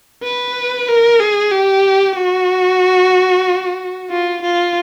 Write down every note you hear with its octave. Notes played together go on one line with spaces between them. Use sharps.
B4
A#4
G#4
G4
F#4
F4
F4